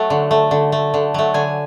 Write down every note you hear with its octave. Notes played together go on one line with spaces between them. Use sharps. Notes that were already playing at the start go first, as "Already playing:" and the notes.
Already playing: F#3 A3
D3
A3
D3
A3
D3
F#3 A3
D3 G#5